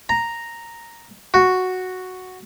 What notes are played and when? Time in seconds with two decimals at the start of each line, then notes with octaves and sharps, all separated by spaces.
0.09 A#5
1.34 F#4